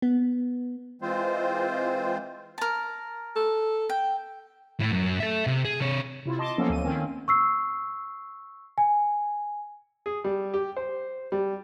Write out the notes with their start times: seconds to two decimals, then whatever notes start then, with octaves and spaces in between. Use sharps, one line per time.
0.02 B3
1.02 E3 G#3 C4 F4 C5
2.58 A#4 A5
3.36 A4
3.89 G5
4.80 A2
4.92 F#2
5.20 A4 E5
5.47 C3
5.65 G#4
5.81 C3 C#5
6.26 C3 E4 F4
6.39 D#5 A5 C6 D6
6.58 F3 F#3 A#3 B3 C#4 A4
6.70 D2 D#7
6.84 D#3 A#3 C4 C#4
7.28 C#6 E6 C7
8.78 G#5
10.06 G#4
10.24 G3
10.54 G4
10.77 C5
11.32 G3